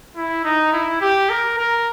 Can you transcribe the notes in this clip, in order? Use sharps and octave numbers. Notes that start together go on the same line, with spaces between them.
E4
D#4
E4
G4
A#4
A#4